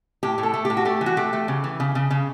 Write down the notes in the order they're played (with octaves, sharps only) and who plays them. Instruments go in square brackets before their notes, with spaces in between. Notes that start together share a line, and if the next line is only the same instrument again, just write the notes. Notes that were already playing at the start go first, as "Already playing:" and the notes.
[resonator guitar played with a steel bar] A2 G4
A2
A4
A3
G4
A2
F#4
A3 G4
E3
F#4
A3 G4
A3
C#3
E3
C#3
C#3
C#3